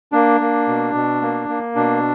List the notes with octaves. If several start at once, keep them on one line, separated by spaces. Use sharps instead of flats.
A#3 D4
A#3
B2
B2
A#3
A#3
B2 D4